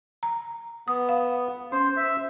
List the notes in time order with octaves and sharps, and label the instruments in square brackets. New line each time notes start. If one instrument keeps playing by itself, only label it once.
[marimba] A#5
[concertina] B3 [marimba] D#6
[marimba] F5
[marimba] C#4 [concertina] C5
[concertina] E5